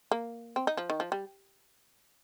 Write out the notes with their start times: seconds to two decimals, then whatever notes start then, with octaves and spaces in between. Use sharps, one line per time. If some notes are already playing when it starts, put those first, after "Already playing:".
0.11 A#3
0.56 C4
0.67 D#4
0.77 F3
0.90 D#3
1.00 F3
1.12 G3